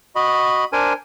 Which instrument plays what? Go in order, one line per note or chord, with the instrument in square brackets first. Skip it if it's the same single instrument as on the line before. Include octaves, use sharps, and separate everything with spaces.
[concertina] F#4 D#5 B5
D4 A#4 C5 G#5